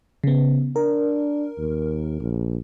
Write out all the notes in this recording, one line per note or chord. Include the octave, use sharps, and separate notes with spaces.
C#3 B3
D4 A#4
D#2
A#1